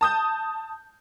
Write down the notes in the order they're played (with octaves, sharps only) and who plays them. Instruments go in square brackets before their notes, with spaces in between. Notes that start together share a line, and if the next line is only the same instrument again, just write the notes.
[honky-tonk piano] A5 D#6 G6